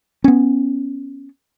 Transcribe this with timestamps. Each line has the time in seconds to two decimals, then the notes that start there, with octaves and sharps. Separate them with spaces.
0.24 B3 C#4